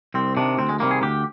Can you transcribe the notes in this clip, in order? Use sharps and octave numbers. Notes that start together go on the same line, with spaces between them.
C2 C4
C3 D#3 D4
D2 C4
G#3
C3 D#3 G3 A#3
G#4
D2 G4